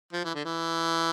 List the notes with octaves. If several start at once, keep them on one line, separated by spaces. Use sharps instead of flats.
F3
E3
D3
E3